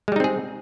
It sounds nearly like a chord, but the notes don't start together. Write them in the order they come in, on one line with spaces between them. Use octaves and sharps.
G#3 G3 D#4 C4 G#4